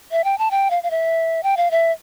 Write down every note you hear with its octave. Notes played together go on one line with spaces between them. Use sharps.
E5
G5
A5
G5
F5
F5
E5
G5
F5
E5